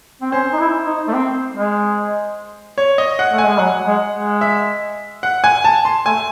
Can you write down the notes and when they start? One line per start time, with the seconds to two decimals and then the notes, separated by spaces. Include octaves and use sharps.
0.22 C4
0.32 C#4 C5
0.53 D#4
0.60 E4
0.86 D#4
1.08 A3
1.13 C4
1.54 G#3
2.78 C#5
2.98 D#5
3.19 F#5
3.32 A3
3.38 G#5
3.45 G#3
3.59 F#3 F#5
3.87 G#3
4.15 G#3
4.41 E5
5.23 F#5
5.44 G#5
5.64 A5
5.85 C6
6.06 A3 G#5